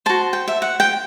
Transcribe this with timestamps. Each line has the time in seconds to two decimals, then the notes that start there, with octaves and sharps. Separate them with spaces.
0.06 F#4 C5 A5
0.33 G5
0.48 E5
0.62 F#5
0.80 G5